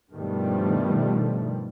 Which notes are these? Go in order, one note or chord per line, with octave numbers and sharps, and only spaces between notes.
G2 B2 D#3 F3 G3 A3